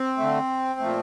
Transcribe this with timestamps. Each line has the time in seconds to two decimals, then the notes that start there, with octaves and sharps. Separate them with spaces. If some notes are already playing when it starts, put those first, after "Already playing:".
Already playing: C4
0.17 D3 A3
0.80 A#2 F3 A3